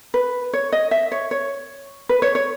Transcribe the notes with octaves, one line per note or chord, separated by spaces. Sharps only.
B4
C#5
D#5
E5
C#5
C#5
B4
C#5
C#5